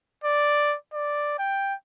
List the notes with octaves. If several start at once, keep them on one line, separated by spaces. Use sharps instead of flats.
D5
D5
G5